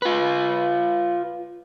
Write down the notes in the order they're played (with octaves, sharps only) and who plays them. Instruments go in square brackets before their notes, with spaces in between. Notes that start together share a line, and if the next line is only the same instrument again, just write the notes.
[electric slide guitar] F4 B4